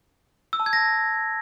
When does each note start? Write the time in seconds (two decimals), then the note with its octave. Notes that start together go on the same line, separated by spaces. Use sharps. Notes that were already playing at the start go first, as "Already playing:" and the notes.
0.53 E6
0.60 A5
0.66 G#6
0.73 A#6